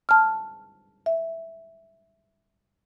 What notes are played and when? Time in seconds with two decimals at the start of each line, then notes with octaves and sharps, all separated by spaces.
0.09 A5 F6
1.06 E5